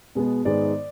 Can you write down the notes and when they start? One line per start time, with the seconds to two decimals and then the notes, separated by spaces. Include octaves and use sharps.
0.15 B2 G#3 B3
0.45 G#2 D#3 G#3 B3 D5